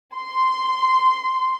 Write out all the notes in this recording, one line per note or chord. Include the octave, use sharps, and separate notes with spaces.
C6